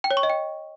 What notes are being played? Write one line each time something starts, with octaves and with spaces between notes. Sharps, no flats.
G5
C#5
C#6
D#5
G5